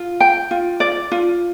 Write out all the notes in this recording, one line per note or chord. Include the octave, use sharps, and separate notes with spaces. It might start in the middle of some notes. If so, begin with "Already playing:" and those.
Already playing: F4
G5
F4
D5
F4